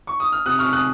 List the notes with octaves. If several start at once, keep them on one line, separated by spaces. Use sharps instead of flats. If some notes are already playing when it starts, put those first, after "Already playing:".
C#6
D#6
F6
C3 D#6 F#6
C#6 F6
C3
D#6 F#6